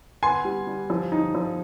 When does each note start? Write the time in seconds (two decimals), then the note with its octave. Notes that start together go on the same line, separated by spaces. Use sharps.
0.23 B3 G#5 C6
0.45 G3
0.67 G3
0.90 F3
1.12 D#4
1.35 F3